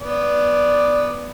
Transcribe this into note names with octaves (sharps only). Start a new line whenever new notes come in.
B3 D5